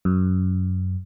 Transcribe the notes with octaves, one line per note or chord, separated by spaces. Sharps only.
F#2